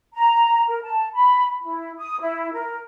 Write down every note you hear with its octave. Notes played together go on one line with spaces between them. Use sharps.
A#5
A#4
A5
B5
E4
D#6
E4
A#4